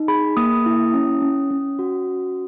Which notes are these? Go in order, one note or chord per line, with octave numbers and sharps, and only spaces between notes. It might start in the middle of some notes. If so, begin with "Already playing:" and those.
Already playing: D#4
G#4 B5
A#3 D#6
E4
C#4
C#4
C#4
F#4
C#4